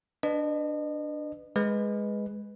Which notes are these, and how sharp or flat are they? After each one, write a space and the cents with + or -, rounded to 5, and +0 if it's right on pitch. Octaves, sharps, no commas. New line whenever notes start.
D4 +0 B4 +5 D#5 -35
G#3 +0 B4 +0